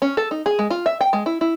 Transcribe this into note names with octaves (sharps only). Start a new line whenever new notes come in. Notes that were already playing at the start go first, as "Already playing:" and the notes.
C#4
A4
D#4
G#4
G#3
F4
E5
G5
G#3
E4
E4